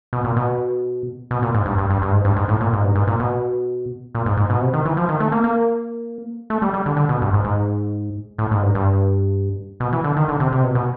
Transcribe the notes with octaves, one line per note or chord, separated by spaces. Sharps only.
B2
A#2
B2
B2
A#2
G#2
G2
G2
G2
G2
G#2
G2
G#2
A2
A#2
G#2
G2
G#2
A#2
B2
A#2
G#2
G#2
B2
C3
D#3
E3
F3
D#3
A3
A#3
A#3
A3
G3
G3
D3
D3
B2
G2
G#2
G#2
A2
G#2
G2
G2
B2
E3
D3
D#3
D3
C3
C3
B2
B2